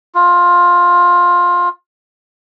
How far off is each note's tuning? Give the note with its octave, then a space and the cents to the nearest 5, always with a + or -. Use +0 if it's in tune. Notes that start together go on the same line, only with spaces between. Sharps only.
F4 +15